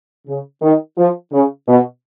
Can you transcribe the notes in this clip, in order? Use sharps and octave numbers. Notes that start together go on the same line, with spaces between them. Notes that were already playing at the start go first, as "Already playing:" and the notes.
C#3
D#3
F3
C#3
B2